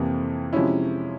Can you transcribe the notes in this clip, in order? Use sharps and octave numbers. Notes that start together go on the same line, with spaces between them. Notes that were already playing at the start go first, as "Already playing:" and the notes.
Already playing: F2 C3 E3 A#3 E4
C3 F3 G#3 C#4 E4